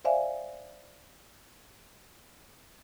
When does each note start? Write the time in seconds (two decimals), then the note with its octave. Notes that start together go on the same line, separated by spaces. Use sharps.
0.05 C5 D5 E5 F5 G#5